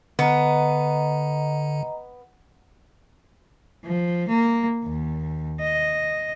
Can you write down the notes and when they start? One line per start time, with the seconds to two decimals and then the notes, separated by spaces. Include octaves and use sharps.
0.19 D3 B3 D#5 A#5
3.85 F3
4.28 A#3
4.84 D#2
5.61 D#5